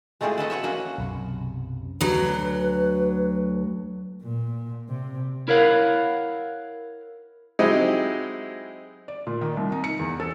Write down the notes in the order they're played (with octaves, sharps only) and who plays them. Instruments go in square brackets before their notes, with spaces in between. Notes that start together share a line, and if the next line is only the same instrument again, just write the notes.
[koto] G#3 A3 C4 E4 F4 G#4
F#4 A4 B4 D#5
F#4 B4 C#5 E5
A#3 C#4 F#4
[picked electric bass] B1 F#2 C3
[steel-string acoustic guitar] D2 F#3 [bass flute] B4
[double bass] A#2
C3
[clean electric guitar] E4 A#4 C#5 F5 F#5
[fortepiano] F#3 G#3 C4 D#4 E4 G4
[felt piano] D5
A#2
D#3
C2
D#4
C#7
E2
A4